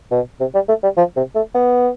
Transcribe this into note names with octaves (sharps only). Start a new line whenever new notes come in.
B2
C3
G3
A3
G3
F3
C3
A3
B3